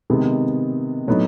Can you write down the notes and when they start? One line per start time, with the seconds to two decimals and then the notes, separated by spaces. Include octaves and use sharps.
0.10 C3 D#3 G#3 B3
1.07 A2 F#3 B3 D#4